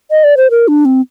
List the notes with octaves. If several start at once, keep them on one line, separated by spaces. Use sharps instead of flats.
D#5
D5
C5
A#4
D4
C4